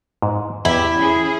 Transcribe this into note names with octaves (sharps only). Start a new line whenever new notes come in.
G#2
E2 E4 G4 E5
C#4 G#4